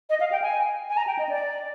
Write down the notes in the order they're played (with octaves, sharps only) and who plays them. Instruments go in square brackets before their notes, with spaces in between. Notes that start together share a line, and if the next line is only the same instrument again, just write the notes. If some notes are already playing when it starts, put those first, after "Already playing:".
[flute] D#5
F5
G5
G#5
G#5
A#5
G5
D#5
D5